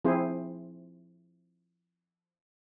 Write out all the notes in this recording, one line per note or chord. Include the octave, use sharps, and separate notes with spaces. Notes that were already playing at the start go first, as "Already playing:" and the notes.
F3 C4 E4 G#4 C5